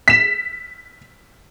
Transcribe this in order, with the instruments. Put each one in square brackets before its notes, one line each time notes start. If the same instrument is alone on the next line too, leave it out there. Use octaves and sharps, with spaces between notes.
[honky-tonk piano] B6 E7